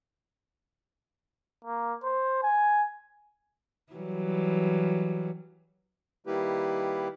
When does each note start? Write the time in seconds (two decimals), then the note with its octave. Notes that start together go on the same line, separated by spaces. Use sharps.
1.65 A#3
2.04 C5
2.43 G#5
3.93 E3 F#3 G3
6.27 D#3 G3 A#3 E4 G4 B4